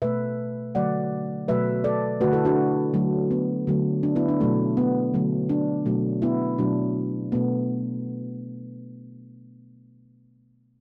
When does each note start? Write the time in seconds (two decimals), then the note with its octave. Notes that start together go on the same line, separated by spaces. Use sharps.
0.02 B2 A3 B4 E5
0.75 D3 F#3 A3 D5 F#5
1.48 B2 F#3 A3 B4 E5
1.84 A4 D5
2.21 D3 A3 F#4 B4
2.33 E4 A4
2.45 D4 F#4
2.94 D3 F#3 A3
3.31 B3
3.67 D3 F#3 A3
4.03 D4
4.16 B3 E4
4.29 D4
4.41 B2 F#3 A3
4.77 B3
5.14 D3 F#3 A3
5.49 D4
5.86 B2 F#3 A3
6.22 B3 E4
6.58 B2 F#3 A3 D4
7.32 B2 A3 B3